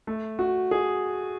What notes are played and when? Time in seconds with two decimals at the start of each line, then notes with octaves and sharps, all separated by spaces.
0.07 A3
0.39 F#4
0.71 G#4